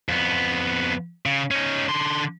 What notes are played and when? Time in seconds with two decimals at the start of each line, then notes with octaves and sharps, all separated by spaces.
0.09 F2 B3
1.26 C#3
1.51 C#4 D#4
1.88 D3 C6